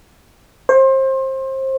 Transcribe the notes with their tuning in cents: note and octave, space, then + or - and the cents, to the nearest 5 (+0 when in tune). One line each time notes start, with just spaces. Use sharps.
C5 +30